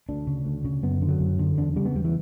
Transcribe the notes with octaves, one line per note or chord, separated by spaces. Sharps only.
D2 D4
C#3
D2
C#3
F#2 B3
D3
F#3
F#2
D3
E2 D4
C#3 G3
B3
E2 G3
E3